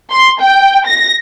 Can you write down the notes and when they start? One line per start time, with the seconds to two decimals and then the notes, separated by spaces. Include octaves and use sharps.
0.11 C6
0.41 G5
0.87 A#6